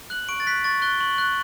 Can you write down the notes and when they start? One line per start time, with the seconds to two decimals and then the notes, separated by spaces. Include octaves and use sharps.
0.10 F#6 F#7
0.29 C#6 D7
0.40 A6
0.47 F#6 B6
0.64 C#6 A6
0.82 F#6 G7
1.00 C#6 F#7
1.18 F#6